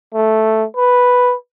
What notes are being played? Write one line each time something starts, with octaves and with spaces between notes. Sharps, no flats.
A3
B4